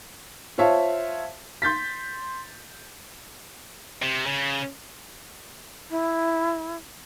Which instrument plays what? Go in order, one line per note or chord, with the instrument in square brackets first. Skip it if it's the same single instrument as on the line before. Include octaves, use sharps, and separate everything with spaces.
[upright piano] F4 C5 C#5 E5 F5 A5
C6 G6 A6 B6
[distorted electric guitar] C3
C#3
[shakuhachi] E4